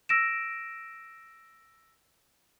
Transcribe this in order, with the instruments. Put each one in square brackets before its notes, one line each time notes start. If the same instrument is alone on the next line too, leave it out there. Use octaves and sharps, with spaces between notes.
[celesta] E6 A#6 D7 E7